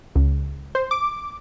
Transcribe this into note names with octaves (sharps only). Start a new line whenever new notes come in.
C#2
C5
D6